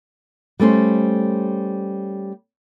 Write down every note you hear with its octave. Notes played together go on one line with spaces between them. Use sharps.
G3 A3 C#4 C5